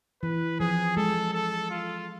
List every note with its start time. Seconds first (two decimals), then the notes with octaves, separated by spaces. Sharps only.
0.23 E3 B4
0.60 F3 G#4
0.97 G#3 A4
1.33 A4
1.70 F4